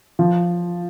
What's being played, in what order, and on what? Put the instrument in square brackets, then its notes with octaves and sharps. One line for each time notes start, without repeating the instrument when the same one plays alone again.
[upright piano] F3